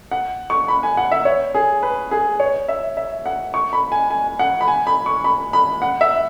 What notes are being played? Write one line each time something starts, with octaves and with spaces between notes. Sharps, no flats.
F#5
C#6
B5
G#5
F#5
E5
C#5
G#4
B4
G#4
C#5
E5
E5
F#5
C#6
B5
G#5
G#5
F#5
B5
G#5
B5
C#6
B5
B5
F#5
E5